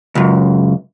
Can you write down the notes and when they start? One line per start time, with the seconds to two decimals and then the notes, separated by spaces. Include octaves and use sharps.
0.15 C#2 F#2